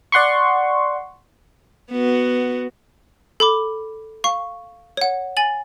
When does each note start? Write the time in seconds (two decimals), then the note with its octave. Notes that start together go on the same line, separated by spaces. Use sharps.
0.12 D5 F#5 C6 C#6
1.92 B3 F#4
3.40 A4 B5 D6
4.24 F5 C#6
4.97 C#5 F#5
5.37 G#5 A6 F#7